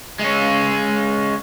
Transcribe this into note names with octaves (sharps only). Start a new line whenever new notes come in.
G#3 C#4